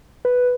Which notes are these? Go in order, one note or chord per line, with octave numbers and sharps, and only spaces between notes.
B4